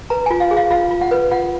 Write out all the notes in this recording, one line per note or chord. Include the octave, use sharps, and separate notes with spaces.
B4 A#5
F4 G#5
F5
G#4
F5
F4 F5
F4
F#5
B4
F4 F#5